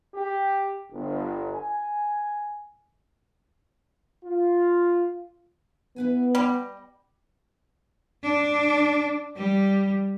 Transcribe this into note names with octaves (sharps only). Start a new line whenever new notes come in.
G4
G1
G#5
F4
B3 E4 B4 G#5
G3 D#5
D4
G3